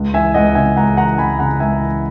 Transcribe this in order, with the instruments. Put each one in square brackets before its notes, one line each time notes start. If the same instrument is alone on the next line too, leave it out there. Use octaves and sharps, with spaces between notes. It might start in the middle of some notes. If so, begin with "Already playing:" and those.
Already playing: [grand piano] C#2
E3 E5 G#5
C#2 D#5 F#5
C#3 E5 G#5
C#2 F#5 A#5
E3 F#5 A#5
C#2 G#5 B5
C#3 F#5 A#5
C#2 E5 G#5
E3